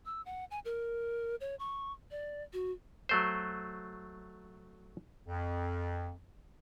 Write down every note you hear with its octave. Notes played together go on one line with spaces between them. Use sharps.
E6
F#5
G#5
A#4
C#5
C#6
D5
F#4
F#3 A3 C5
F2